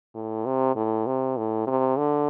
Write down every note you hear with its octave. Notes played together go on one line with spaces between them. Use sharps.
A2
C3
A2
C3
A2
C3
D3